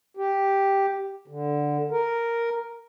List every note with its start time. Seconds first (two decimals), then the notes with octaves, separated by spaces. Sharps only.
0.17 G4
1.28 D3
1.91 A#4